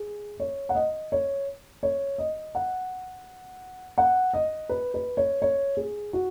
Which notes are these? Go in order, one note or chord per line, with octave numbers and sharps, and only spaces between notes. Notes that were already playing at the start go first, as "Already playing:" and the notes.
Already playing: G#4
C#5
F#5
D#5
C#5
C#5
D#5
F#5
F#5
D#5
B4
B4
C#5
C#5
G#4
F#4